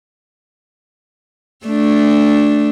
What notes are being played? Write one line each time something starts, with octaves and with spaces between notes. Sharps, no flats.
A3 D4